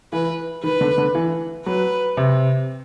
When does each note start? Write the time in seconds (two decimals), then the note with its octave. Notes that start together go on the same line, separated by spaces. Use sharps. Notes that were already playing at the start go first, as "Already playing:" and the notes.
0.13 E3 B4
0.64 D#3 B4
0.81 D3
0.98 D3
1.15 E3
1.66 F#3 B4
2.17 C3